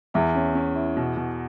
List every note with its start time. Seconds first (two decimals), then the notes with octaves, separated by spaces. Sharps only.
0.14 E2 E4
0.35 C#4
0.55 C#4
0.75 E4
0.96 B2
1.16 B2